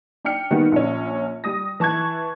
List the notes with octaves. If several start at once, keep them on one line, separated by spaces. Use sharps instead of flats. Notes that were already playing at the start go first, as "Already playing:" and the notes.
D4 G5 F6 C#7
D#3 G3 B3 F#4
A#1 C#4
G3 D#6 A#6
E3 A5 C#6 F#6 G#6